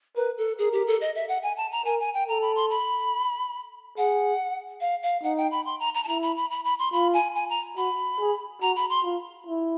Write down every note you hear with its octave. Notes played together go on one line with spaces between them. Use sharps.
A#4 B4
A4
G#4 A#4
G4
A4
D#5
E5
F#5
G#5
A5
A#5
A#4 G#5
G#5
G5
A4 A#5
B5
C6
B5
G#4 F#5
F5
F5
D#4 F#5
G5
B5
C6
A#5
A#5
A5
E4 A#5
B5
B5
B5
B5
C6
F4 B5
G#5
G#5
A#5
F#4 B5
G#4
F#4 A#5
B5
C6
F4
E4